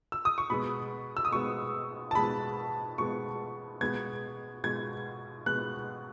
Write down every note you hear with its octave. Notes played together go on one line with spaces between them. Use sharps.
E6
D#6
C#6
B2 G#3 B3 B5
E6
D#6
B2 G#3 B3 C#6
A5
B2 G#3 B3 B5
B2 G#3 B3 C#6
B2 G#3 B3 G#6
B2 G#3 B3 G#6
B2 G#3 B3 F#6